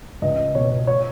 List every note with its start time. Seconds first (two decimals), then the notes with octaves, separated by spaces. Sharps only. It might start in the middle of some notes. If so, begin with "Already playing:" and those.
0.22 C#2 D#5
0.55 B2 C#5
0.87 C#5